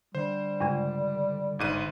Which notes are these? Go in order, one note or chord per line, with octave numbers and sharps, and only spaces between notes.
D3 G3 C5
G2 C#3 G#3
G1 G#2 D#7